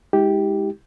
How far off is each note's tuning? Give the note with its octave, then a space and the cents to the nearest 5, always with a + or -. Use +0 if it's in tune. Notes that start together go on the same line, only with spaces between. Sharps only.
G#3 +0 E4 -45 G4 -5